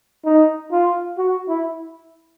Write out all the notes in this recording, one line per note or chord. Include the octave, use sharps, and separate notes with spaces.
D#4
F4
F#4
E4